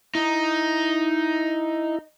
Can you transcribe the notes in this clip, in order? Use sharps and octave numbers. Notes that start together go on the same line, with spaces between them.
D#4 E4